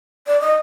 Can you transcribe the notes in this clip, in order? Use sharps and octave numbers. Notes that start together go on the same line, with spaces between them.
D5
D#5